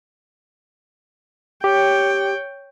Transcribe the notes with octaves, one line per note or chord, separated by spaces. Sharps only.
G4 C#5 G5